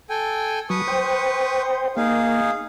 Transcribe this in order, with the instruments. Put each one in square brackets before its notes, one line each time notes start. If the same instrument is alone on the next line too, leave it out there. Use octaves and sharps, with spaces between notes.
[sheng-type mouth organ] A4 G5 G#5
[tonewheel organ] F#3 [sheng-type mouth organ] B4 C#6 D#6
[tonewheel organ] C5 G5
[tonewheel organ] A#3 [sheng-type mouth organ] D#4 G#4 F5